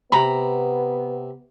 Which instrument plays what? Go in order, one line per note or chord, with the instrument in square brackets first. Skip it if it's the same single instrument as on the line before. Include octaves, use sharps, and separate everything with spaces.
[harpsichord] C3 [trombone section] B3 [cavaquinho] A#5 B5